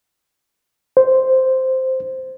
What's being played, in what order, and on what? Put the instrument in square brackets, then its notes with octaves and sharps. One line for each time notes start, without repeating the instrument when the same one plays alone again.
[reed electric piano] C5